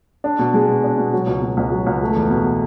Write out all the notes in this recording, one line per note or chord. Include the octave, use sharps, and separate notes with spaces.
D4
B2
G#3
B2
D4
B2
F#3
C#2
B2
C#2
F#3
C#2
A3
E2
B2